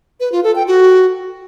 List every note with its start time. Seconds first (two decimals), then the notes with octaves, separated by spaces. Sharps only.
0.20 B4
0.32 F4
0.44 A4
0.55 G5
0.67 F#4